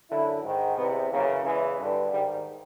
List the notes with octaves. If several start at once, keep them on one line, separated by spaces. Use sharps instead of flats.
F#2 D3 E4
G#2 D#3
E2 C3 E3 B3
F#2 C#3 E3 A#3
E2 C#3 E3 G#3
G2 D3
G#2 D#3 G3